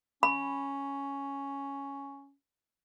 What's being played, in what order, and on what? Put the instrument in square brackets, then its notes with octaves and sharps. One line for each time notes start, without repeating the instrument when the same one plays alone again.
[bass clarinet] C#4 [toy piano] B5